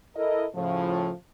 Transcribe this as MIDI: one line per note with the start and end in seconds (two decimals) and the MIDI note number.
0.16 0.45 64
0.16 0.45 69
0.16 0.45 70
0.16 0.45 75
0.55 1.11 45
0.55 1.11 49
0.55 1.11 53